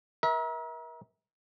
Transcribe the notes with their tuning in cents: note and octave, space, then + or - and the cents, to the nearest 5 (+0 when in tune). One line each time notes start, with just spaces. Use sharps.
A#4 +35 E5 -35